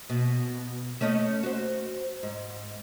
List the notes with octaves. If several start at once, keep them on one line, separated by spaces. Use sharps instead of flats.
B2
A3 C#4 D#5
F#4 C5
G#2